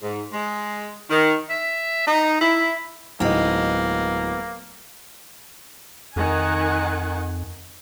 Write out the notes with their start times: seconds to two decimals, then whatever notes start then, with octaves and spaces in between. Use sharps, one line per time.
0.03 G#2
0.33 G#3
1.10 D#3
1.49 E5
2.07 D#4
2.41 E4
3.20 D1 G#3 A#3 B3 D#4
6.16 F2 D#3 F#5 G#5